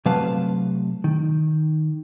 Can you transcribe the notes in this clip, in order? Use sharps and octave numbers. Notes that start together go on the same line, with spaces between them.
C3 F#3 A3 B4 F5 A5
D#3